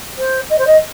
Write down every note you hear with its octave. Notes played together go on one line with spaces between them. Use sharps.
C5
D#5
C5
D#5